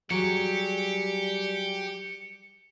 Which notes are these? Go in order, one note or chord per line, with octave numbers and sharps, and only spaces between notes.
F#3 G3 G4 G#4 C#7